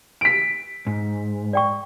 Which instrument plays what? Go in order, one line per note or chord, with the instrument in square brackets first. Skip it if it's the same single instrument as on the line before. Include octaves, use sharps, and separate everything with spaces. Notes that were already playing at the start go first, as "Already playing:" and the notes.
[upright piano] B6 D7
[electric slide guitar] G#2
[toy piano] D5 G5 C#6